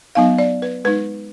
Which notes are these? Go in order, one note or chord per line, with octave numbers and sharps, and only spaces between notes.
F#3 B3 D#4 F5
D5
B4
G#3 D#4 B4